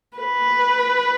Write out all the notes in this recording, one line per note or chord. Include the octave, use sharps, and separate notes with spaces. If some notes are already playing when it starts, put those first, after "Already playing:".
B4